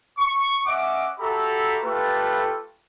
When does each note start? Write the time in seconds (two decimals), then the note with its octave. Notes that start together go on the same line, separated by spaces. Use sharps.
0.18 C#6
0.67 C#4 D#5 E5 F#5 D6
1.19 F#4 G4 A4 E5 A#5 B5
1.83 A3 F4 G4 A4 B4